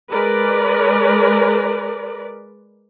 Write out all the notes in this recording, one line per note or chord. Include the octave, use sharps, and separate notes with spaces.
G#3 A#4 B4 D5